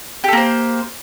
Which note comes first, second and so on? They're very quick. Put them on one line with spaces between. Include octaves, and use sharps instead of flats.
G4 A4 A#3 C5